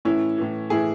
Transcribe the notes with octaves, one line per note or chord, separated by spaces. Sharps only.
A2 E3 C#4 E4
A2 E3
A2 E3 E4 G#4